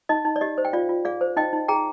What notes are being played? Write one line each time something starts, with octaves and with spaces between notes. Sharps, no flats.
D#4 D#5
D#4
D5
G4 D#5
C5
G5
F4 D5 F5
F4
G#4 D5 F5
C5
D#4 D#5 G5
D#4
G#4 G5 A#5